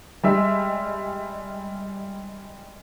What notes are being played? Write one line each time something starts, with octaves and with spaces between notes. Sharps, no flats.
G3 G#3 E5